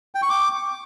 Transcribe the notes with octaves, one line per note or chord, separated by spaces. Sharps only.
G5
C#6
D6